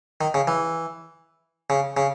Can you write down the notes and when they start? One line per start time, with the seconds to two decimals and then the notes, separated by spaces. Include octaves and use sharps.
0.21 D#3
0.34 C#3
0.48 E3
1.70 C#3
1.97 C#3